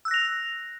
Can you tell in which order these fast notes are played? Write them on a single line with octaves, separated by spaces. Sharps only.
E6 F#6 A#6 F7